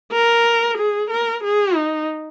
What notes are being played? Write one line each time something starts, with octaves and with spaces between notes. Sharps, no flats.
A#4
G#4
A#4
G#4
D#4